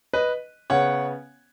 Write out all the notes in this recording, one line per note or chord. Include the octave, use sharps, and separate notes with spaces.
B4 D#5
C#3 B3 C#5 F#5